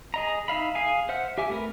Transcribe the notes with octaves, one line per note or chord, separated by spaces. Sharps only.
G#4 D#5 A#5
D#4 E5 F5 B5
G#4 F5 G#5
C5 E5 F#5 F6
G4 E5 G#5 D6
A3 C4 A#4 B4